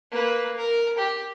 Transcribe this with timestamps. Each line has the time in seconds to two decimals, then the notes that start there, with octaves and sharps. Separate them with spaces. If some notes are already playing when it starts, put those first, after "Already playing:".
0.11 A#3 B4
0.56 A#4
0.98 G4